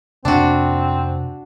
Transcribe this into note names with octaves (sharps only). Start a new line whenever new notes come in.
F2 C3 A#3 C4 D4 F#4